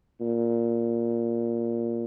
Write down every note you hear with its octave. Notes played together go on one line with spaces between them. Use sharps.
A#2